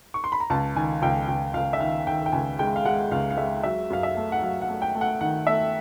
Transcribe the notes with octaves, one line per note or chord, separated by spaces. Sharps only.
C#6
C6
B5
A#5
C#2 A5
D#3 G#5
C#2 G5
C#2 G5
C#2 F5
E5
D#3 F5
D#3 G5
G5
C#2 G#5
G#3 G5
F5
G#3 F#5
C#2 F5
F5
G#3 E5
F#3 E5
F#2 F5
E5
A3
F#5
F#3 F5
F#5
A3
G5
A3
F#5
D#3 F#5
A3 E5